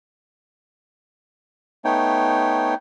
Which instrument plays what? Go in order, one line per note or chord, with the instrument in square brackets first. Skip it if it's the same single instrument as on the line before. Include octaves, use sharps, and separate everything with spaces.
[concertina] A3 B3 D#4 C#5 G5